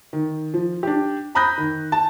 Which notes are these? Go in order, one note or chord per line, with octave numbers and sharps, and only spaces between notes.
D#3
F3
D4 G4
A#5 B5 D#6 F#6 G6 A#6
D#3
A5